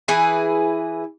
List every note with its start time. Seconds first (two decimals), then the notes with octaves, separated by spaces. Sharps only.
0.08 E3 E4 G#4 B4